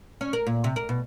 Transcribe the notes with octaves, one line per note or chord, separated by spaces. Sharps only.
C#4
A#4
A#2
C3
A#4
B2